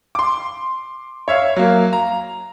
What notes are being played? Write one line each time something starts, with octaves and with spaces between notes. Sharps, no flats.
C6 D6
C#5 E5 F5
F#3 A#3
A#5